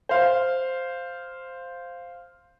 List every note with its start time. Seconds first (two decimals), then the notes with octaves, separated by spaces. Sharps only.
0.09 C5 F5